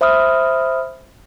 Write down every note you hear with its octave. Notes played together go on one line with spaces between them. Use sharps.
C5 E5 B5 D#6 F6